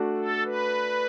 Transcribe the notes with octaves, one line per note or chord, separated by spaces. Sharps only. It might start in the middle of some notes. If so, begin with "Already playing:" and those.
Already playing: A3 D4 F#4 D5
A4
B4